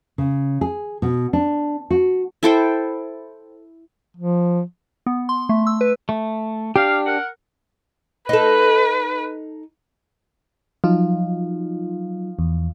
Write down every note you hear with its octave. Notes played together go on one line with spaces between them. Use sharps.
C#3
G#4
B2
D4
F#4
E4 A4 C5 G5
F3
B3
C6
A3
E6
B4
A3
D4 G4 F5
A#4 F#5
D#4 A4 B4
F3 F#3 D#4 F4
E2